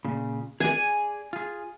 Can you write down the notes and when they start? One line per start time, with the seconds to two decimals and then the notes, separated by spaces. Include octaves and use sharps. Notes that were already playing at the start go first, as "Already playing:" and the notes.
0.05 A#2 C#3
0.60 G#4 D5 G#5
1.33 F4 G#4